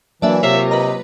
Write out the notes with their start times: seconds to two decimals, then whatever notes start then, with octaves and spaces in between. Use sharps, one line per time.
0.22 E3 F#3 A#3 D4 D5 E5 G#5
0.43 C3 F4 A#4 C#5 E5
0.71 B4 D#5 A#5